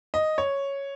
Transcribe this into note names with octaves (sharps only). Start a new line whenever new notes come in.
D#5
C#5